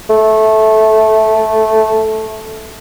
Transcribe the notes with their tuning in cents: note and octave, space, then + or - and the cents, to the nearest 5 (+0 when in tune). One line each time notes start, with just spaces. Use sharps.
A3 -10